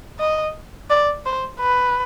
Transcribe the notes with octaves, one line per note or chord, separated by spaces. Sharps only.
D#5
D5
C5
B4